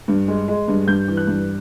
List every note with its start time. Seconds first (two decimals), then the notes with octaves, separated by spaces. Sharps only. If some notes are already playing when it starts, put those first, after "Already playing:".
0.08 G2
0.28 G#3
0.48 G#3
0.68 G2
0.87 G2 G6
1.08 E3
1.17 F#6
1.27 G2